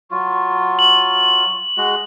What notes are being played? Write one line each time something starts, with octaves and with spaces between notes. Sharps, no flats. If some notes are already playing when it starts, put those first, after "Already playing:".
F#3 F4 C#6
F#7
G#3 F#4